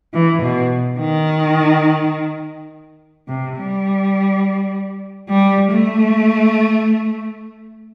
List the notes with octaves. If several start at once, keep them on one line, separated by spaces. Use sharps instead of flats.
E3
B2
D#3
C3
G3
G3
A3